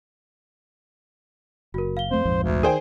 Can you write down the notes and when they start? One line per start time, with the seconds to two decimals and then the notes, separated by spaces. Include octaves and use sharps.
1.74 F#1 F#4 A#4
1.97 F5 G7
2.11 F2 A3 C4 C5
2.25 A#1 F2 G#2
2.43 D2
2.63 D#3 G#4 A#4 C5 D5 G5